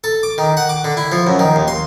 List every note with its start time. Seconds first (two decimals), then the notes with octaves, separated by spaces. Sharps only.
0.04 A4
0.23 D6
0.38 D#3
0.57 F#5
0.69 D6
0.84 D3
0.97 E4
1.12 F3
1.27 F#2
1.39 D#3
1.56 D#2
1.68 C6